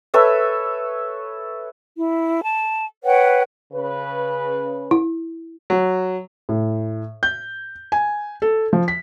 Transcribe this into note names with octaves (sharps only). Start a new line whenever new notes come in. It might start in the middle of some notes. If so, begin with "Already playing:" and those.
A4 B4 C#5 E5
E4
A5
B4 C#5 F#5 G5
C#3 B4
E4
F#3
A2
G6
G#5
A4
F3
B6